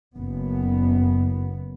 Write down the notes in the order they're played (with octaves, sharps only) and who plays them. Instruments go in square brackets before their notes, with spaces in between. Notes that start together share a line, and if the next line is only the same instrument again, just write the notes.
[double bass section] F#1 F#2 B3